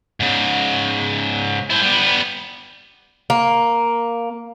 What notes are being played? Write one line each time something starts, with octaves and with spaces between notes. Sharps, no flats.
G#2 C#3
E4 C5
G3 B3
A#3